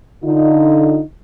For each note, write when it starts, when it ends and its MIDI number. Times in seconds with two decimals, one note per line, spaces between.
0.24 1.00 50
0.24 1.00 63
0.24 1.00 65